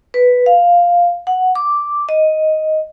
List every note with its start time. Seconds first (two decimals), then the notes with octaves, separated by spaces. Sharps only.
0.14 B4
0.46 F5
1.27 F#5
1.55 D6
2.09 D#5